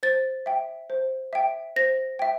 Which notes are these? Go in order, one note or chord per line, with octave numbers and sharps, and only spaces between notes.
C5 A6
E5 G5
C5
E5 G5
C5 A#6
E5 G5